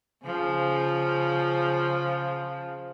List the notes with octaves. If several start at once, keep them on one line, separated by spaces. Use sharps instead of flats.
C#3 F3